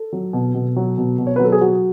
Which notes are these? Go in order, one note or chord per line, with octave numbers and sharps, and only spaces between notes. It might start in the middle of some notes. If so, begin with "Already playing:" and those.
Already playing: A4
F#3
B2
B2
F#3
B2
B2
C#5
F#3 B4
A4
G#4
F#3 F#4